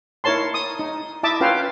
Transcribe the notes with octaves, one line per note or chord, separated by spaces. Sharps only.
D#4 E4 A#4 C#5 A5 C6
D#6
D#4
E4 D#5 E5 A5 D6
C#4 F4 B4 C#5 F5 G5